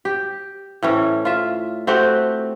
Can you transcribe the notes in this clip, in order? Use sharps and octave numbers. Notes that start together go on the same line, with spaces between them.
G4
A2 E3 C#4
F4 E5
A3 C4 F#4 G4